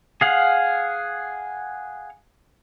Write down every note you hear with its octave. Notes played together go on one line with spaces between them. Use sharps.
G#4 F5 F#5